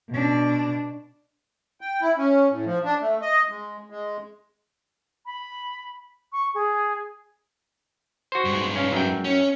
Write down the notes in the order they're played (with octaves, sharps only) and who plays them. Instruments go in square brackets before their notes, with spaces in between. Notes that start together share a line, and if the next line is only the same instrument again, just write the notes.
[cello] B2 D4
[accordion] G5
E4
C#4
A2
F3
D4
A3
D#5
G#3
G#3
[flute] B5
C#6
G#4
[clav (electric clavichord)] F#4 C5
[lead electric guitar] G2 G#3
[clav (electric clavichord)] C#4 F5
F#2 G5
[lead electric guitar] C#4